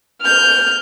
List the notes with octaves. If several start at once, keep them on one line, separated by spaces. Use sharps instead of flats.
F6 G6